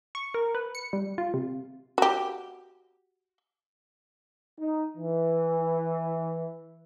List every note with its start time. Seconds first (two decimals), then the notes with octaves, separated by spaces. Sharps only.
0.15 C#6
0.34 A#4
0.55 B4
0.75 C#7
0.93 G3
1.18 F4
1.34 C3
1.98 F#4 G4
4.59 D#4
4.96 E3